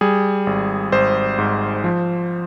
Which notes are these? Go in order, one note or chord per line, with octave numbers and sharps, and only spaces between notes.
G3 G#4
G#1
G#1 C5
G#2
F3